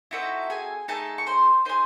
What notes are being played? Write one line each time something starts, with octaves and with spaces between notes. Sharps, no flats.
C4 D#4 E4 F#4 A4 E5
G#4 G#5
A3 D#4 G#4 A4 A5
C#6
C5 C6
D#4 G#4 C5 C6